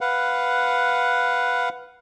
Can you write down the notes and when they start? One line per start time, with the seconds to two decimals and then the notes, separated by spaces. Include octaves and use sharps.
0.01 B4 F5 F#5